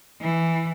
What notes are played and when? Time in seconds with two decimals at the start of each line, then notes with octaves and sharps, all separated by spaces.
0.21 E3